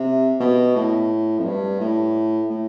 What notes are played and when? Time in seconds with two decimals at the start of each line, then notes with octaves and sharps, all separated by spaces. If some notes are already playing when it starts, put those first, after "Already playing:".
Already playing: C3
0.40 B2
0.76 A2
1.39 F2
1.45 G2
1.80 A2
2.50 A2